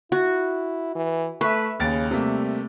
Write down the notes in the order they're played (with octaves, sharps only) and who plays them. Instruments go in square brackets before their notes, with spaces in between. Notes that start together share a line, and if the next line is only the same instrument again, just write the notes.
[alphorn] E4 [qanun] F#4
[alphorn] E3
[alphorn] A3 [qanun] B4 [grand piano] E5 C#6
[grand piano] D#2 A6 D7 [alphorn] C#3
[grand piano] C3 A3 A#3 [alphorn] G3